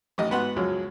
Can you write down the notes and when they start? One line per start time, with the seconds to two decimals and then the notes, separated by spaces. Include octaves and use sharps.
0.18 A1 D#3 D#5
0.31 G#2 B3 F#4 B4 F#5 C6
0.56 C#2 F#2 F3 F#3 G#3 C#4